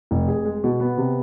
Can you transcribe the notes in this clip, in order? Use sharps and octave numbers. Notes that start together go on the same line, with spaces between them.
F1
G#4
G#3
B2
B3
C3